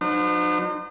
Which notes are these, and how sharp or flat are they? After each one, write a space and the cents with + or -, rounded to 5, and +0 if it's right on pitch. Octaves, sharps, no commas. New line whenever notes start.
F#3 -40 D#4 -40 C5 -45